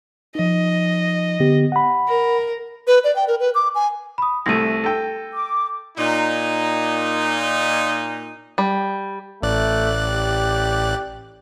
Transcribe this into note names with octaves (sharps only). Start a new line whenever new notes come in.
F3 D#4 D#5
D3 B3 G4
F#5 B5
A#4
B4
D5
G5
A#4
B4
D6
G#5
B5 D#6
C2 A3 A#6 D#7
A4 G5
D6
A#2 D#4
G3
A1 A3 D5 F#6
G4